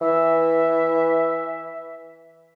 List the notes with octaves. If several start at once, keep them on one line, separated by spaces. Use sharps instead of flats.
E3 E5